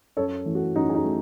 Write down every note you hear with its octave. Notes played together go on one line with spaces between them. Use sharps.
F#2 A4 C#5
E3 A3
F#4 A4
F#2 D#4 F#4
G#4
D#4 F#4
A3